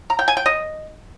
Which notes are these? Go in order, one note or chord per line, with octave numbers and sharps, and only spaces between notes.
A#5
G5
G#5
G5
D#5